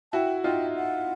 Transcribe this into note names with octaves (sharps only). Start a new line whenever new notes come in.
E4 F#4 G5 A5
D#4 F4 G5
F#5